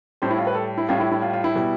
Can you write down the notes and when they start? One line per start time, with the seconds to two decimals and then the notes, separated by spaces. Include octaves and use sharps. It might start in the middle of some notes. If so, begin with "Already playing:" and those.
0.22 A2 G3 C5
0.31 E4
0.38 F4
0.47 B4
0.55 A4
0.78 E4
0.89 A2 G3 F4
1.00 E4
1.11 E4
1.22 F4
1.33 F4
1.44 E4
1.55 B2 G3